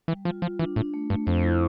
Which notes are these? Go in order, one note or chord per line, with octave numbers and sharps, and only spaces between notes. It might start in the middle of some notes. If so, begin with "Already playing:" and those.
E3 G3
F3 F4
F3 F4
E3 D4
A2 D4
A3
G2 A3
F2 C5
E4